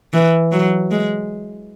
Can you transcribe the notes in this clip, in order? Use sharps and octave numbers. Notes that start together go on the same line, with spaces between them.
E3
F#3
G#3